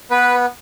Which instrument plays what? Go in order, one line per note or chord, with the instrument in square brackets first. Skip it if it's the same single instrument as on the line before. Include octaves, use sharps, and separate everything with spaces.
[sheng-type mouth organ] B3 B4